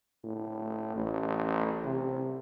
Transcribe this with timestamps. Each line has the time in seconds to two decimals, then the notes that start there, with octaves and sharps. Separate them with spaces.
0.24 A2
0.96 A1
1.85 C3